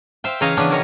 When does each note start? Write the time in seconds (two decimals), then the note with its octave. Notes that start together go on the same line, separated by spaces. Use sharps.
0.24 C5 E5 F5 G5
0.41 C#3 E3 C#5 D#5 F5 A#5
0.57 C#3 E3 B3 C#4 D4
0.70 B2 D#3 E3 A#4 C#5 A#5